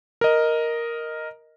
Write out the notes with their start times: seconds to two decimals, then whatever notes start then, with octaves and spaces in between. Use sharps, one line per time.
0.21 A#4 D#5